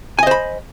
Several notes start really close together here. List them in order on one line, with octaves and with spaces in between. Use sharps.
G#5 D#5 C5 B5